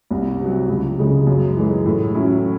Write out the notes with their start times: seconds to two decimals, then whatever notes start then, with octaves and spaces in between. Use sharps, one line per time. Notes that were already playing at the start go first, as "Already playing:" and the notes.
0.11 C2
0.40 C3 F#3
0.68 C#2
0.98 C#3 G#3
1.27 F#2
1.56 E3 G#3
1.86 A2
2.15 F#3 C#4 E4